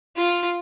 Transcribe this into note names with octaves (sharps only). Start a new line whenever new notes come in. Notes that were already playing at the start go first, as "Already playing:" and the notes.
F4